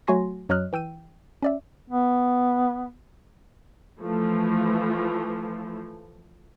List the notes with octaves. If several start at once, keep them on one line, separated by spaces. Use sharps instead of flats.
F#3 A3 F#4 G#5 C6 A#6
F#2 F#3 C#5 D#5 F6 F#6
E3 G5 E6 D#7
C#4 D5 E5
B3
E3 F3 A3